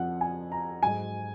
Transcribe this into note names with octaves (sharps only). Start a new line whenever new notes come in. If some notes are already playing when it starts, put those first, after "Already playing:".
Already playing: F2 F3 F#5
G#5
A#5
G#2 F#3 G#5